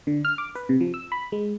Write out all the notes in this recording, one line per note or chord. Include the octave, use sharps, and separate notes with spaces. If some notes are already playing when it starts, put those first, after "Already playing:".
D3
F6
D6
B4
C3
F3
E6
B5
G#3